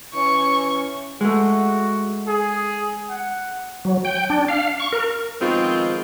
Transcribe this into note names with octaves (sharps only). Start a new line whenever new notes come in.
E3 C#4 C#6
G#3 A3 F#4
G#4
F#5
F#3
G5
D4
F5
C#6
A#4
B2 D#3 F3 G#3 C4 F4